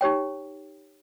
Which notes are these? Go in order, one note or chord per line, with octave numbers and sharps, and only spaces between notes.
D#4 G4 C#5 G5